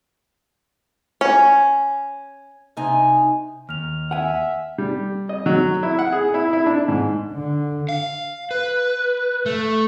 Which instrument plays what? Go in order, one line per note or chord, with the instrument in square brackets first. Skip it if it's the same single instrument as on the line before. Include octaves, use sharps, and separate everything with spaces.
[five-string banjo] C#4
[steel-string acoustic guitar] C3 D#4 G#5
[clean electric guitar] D#2 [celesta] F6 F7
[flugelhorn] E5 [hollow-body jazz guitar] F#5 G#5
[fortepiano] G3
D#5
F#3
E4
F#5
G#4
E4
E4
D4
G#2
[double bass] D3
[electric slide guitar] F5
B4
A3